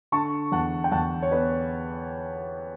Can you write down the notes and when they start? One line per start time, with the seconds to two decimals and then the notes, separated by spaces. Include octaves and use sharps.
0.12 D3 A5 C#6
0.52 E2 F#5 A5
0.84 G5
0.91 E2 F#5 A5
1.22 C#5
1.31 B3 B4